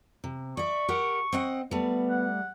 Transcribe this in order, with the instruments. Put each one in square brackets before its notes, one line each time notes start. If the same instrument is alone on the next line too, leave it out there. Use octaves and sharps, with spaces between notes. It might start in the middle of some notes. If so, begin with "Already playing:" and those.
[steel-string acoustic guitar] C3
[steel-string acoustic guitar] D5 E5 [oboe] C#6
[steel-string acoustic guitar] G4 A#4 F#5
C4 D#5 F#5
[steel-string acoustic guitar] G3 A3 [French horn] B3
[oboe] F#5